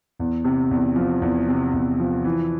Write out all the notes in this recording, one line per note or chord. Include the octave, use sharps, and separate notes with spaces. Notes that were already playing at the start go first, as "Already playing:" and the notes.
E2
C3
E2
F3
E2
C3
E2
F3
E3